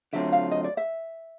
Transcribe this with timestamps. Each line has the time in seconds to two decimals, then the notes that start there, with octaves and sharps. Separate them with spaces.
0.13 D3 F#3 A3 C4 F4 E5
0.32 F5
0.51 D#5
0.64 D5
0.77 E5